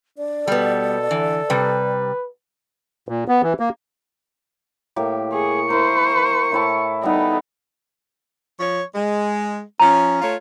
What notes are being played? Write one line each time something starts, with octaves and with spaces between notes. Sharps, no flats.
D4 D5
B2 G3 B3 A4
D3 E3
C3 G3 B4
A#2
B3
E3
A#3
A2 A#3 G4
G#4 C#6
E4 A#4 C5
A2 E4 A5
G3 B3 D#4 A4
F3 C#5
G#3
F3 C#4 A#5
A3 F4 C#5